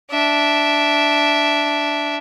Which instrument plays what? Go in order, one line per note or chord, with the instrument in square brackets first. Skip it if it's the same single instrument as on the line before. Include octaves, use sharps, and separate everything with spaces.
[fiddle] D4 E5